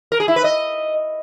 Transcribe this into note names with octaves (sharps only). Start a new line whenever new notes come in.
A#4
G#4
E4
B4
D#5